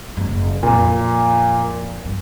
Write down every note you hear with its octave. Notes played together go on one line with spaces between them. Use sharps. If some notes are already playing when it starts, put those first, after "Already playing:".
F#1 F#2
F2 A#2
G2